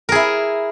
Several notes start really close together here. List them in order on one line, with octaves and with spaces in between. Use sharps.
A#4 G#4 E4